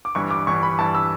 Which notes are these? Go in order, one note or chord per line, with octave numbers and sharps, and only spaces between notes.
D6
G1 G2 E3 C#6
D6
G1 G2 E3 C#6
B5
G1 G2 E3 A5
E6